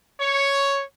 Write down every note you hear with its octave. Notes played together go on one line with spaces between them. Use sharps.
C#5